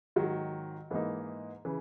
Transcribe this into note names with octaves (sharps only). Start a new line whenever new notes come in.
G#2 D#3 F#3
G#2 E3 A#3 D#4
C#3 E3